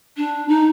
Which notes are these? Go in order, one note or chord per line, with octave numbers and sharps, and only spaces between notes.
D4
D#4